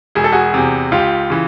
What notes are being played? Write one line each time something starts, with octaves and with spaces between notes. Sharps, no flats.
E1 G#4
A4
F#4 G#4
E2 C3
C#2 F4 G4
C#3 E3